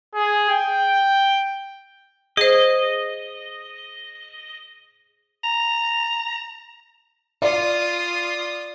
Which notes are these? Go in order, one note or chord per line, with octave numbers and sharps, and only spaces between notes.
G#4
G5
G#4 C5 D#5
A#5
F4 D5 D#6